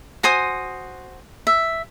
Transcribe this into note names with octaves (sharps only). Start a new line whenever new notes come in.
F#4 C5 G#5 D#6
E5